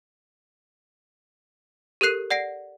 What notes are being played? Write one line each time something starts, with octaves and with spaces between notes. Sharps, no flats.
G4 A4 A#4 F#6 C7 D#7
D5 F#5 A#6 C7 D7